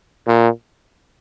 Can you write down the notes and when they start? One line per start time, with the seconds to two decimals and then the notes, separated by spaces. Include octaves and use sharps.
0.27 A#2